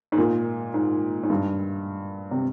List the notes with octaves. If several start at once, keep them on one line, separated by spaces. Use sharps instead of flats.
G#2
A#2
G#2
G#2
G2
C3